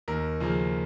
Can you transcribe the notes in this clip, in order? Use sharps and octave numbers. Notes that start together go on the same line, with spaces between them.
D#2 A#4
C#3 F3 A#3